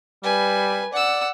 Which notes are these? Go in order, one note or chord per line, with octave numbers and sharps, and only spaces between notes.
G3 B4 G#5
D5 F#5 E6